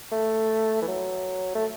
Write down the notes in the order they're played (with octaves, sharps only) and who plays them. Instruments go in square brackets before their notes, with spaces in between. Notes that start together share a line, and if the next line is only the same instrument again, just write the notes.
[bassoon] A3
E3
F#3
A3